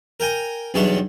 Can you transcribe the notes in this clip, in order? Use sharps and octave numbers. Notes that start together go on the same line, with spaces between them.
A#4 G5 G#5 A#5
B1 E2 G3 D4 C#5 E5